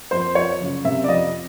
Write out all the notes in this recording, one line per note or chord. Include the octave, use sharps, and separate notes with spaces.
F2 C5
F3 C#5
F#1
C3 E5
D5
F2 D#5